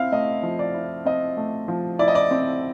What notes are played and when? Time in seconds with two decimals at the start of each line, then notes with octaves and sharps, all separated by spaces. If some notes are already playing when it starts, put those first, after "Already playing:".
Already playing: C4 E4 F5
0.12 A3 D#5
0.43 F3
0.59 D5
0.74 E4
1.05 C4 D#5
1.37 A3
1.68 F3
1.99 E4 D5
2.08 D#5
2.15 D5
2.31 C4